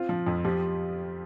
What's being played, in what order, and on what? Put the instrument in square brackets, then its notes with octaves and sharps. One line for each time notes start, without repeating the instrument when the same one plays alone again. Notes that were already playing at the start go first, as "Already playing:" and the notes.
Already playing: [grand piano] C4 [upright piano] F4
[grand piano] F3
F2
[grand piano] F3 [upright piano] G4